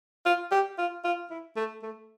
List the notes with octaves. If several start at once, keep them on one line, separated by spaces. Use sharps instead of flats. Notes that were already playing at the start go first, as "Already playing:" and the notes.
F4
G4
F4
F4
E4
A3
A3